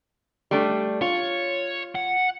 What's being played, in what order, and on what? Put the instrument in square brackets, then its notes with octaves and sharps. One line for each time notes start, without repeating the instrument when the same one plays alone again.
[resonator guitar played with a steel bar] G3 A3 D4
[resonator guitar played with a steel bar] F4 [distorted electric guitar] C#5
[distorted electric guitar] F#5